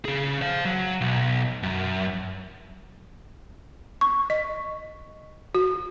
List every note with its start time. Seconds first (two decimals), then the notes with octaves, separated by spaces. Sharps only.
0.05 C#3 G#4
0.42 C5 F5
0.65 F#3
1.01 B1
1.63 F#2
4.01 C#6
4.30 D#5
5.55 F#4